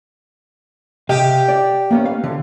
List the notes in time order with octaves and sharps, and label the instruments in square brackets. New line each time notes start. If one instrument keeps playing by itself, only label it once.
[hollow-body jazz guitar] C3 D#5 F5 [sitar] G4
[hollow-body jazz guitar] D5
A#3 B3 C#4
F5
D3